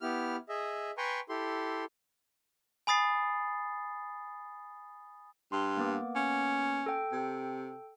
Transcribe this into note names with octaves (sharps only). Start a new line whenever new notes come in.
B3 E4 G4 F6
G#4 D#5 E5
B4 G5 G#5 A#5 C6 C#6
E4 G4 A4 C6
G#5 B5 D#6 A6 C7
G2 C6
A#3 B3 D6
C#4
A4 G5
C3